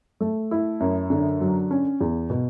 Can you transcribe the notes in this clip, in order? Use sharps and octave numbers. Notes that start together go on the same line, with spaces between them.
A3
E4
F#2
D3
F#3
C#4
E2
B2